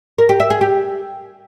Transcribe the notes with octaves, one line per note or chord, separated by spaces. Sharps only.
A#4
G4
E5
G#4
G4